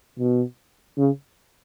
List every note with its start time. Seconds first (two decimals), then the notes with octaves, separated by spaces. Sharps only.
0.19 B2
0.97 C#3